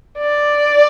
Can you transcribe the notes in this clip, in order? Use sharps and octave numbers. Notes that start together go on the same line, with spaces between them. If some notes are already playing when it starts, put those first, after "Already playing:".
D5